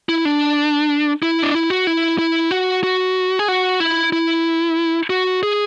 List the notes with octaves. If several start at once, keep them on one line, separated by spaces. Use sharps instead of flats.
E4
D4
E4
D4
E4
F#4
E4
E4
F#4
F#4
G#4
F#4
E4
E4
F#4
G#4